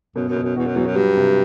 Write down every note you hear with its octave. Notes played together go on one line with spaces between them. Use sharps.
F#2 B2
F#2
B2
F#2
E2 F#4
F#2
E2 F#3
F#2
G2 G3
C3